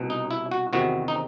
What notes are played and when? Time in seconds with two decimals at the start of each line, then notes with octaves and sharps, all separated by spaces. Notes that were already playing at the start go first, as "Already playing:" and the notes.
Already playing: C2 B2
0.10 D#4
0.31 E4
0.51 F#4
0.73 E2 C3 D#3 F#4
1.08 D#4